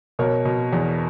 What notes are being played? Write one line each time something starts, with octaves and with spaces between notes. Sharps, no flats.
B2 A#4 C#5
B2
E2